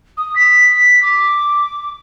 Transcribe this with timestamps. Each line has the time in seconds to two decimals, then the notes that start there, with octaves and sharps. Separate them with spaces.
0.17 D#6
0.35 B6
1.02 D6